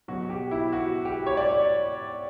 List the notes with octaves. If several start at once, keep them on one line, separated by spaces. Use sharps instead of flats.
B2 F#3 F#4
G4
E4
F#4
G4
C#5
D5